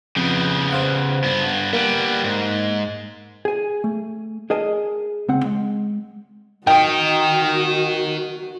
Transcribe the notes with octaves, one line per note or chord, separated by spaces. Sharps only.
F2 C#3 B3 G6
C5 F5 F#5
G2 B3
G3 A#3 B3 F#6
G#2
G#4 G#5
A3
G#4 A#4 D#5 G#5 A5
C#2 C4 F#5
G#3
D#3 F#4 A#4 D#5 G5